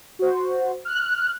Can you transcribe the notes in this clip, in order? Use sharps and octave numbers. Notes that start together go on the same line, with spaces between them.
F#4 C5
F6 F#6